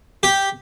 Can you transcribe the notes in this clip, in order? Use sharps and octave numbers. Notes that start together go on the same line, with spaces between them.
G4